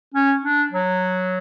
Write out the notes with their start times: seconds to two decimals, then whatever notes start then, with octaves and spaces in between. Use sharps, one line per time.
0.14 C#4
0.43 D4
0.72 F#3